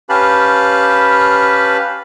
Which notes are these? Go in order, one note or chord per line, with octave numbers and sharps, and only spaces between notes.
C#4 G4 B4 F5 A5 B5